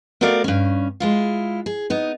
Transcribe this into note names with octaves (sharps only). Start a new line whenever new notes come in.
A3 B3 F#4 A#4 D5 F5
G2 C#4
G#3 E4 F4
G#4
B3 D#4